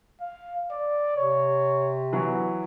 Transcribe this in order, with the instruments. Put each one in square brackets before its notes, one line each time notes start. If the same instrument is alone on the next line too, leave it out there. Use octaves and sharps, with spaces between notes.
[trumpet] F5
D5
[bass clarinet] C3 [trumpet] C#5
[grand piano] E3 F#3 [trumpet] B3